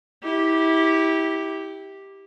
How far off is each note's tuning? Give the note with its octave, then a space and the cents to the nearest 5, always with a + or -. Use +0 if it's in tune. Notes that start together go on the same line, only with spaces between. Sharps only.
E4 -25 G4 +0